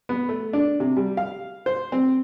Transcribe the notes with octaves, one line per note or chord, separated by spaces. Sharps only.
B3
A3
D4
C3
G3
F5
C5
C4